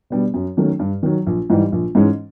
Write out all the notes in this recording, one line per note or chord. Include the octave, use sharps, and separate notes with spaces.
B2 G3 B3 D4
F#2
D#3 F#3 A3 C#4
G2
D#3 F#3
A#1
G#2 E3 G3
A#1
G#2 E3 G#3 C#4